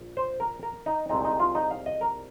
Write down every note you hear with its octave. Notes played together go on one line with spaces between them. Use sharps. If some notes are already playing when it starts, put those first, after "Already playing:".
Already playing: A#1
C5
A#4
A#4
D#4
C2 A#2 G#3 C4 D#4
D#4
F4
D#4
F5
D#5
A#4